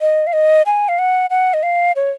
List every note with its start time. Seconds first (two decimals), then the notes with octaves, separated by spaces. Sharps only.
0.01 D#5
0.27 F5
0.33 D#5
0.66 G#5
0.89 F5
0.99 F#5
1.30 F#5
1.54 D#5
1.63 F5
1.96 C#5